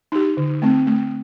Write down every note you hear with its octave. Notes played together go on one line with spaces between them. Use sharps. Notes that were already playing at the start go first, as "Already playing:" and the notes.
D#4 G4
D3
A3 C4
A3